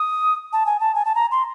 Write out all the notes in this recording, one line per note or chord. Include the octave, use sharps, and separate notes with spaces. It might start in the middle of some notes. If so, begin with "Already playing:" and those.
Already playing: D#6
A5
G#5
A5
G#5
A5
A#5
C6